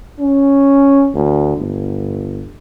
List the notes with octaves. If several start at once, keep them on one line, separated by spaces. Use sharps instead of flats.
C#4
D2
G1